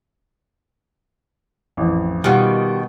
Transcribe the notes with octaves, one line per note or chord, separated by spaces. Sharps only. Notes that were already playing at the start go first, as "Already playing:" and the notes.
A1 F2
B2 D#3 G3 F4 F#5